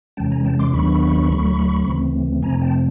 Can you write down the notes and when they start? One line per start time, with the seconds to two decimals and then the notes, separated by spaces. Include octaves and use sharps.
0.17 E2 C3 E3 G#3 C#4 G5 A5
0.31 G#5 A#5
0.45 G5 A5
0.59 C6 D6
0.74 D#2 D#3 F#3 B3 D4 B5 C#6
1.30 D2 D3 F#3 A3
1.86 D2 C#3 E3 A3 C4
2.43 F2 C3 F3 A3 C4 G#5 A#5
2.61 G5 A5